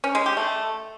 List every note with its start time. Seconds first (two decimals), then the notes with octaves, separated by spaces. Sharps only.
0.04 C#4
0.15 G#3
0.26 G4
0.37 A3